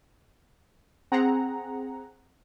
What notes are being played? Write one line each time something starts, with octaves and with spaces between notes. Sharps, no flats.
C4 G#4 F#5 A#5